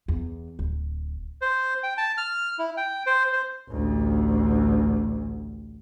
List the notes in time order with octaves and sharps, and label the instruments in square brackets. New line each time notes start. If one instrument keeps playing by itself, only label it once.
[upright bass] E2
D1
[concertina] C5
G5
A5
F6
E4
G5
C5
C5
[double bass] A1 D2